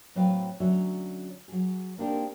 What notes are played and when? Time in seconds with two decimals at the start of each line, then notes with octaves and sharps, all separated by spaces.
0.15 A2 F#3 C4 B4 F5 G5
0.60 D2 F#3 C#4 C#5 E5
1.48 F#3 G#4
1.98 A#3 C4 D4 D#4 G4 A#4